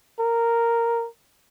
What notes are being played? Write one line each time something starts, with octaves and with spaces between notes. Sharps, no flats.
A#4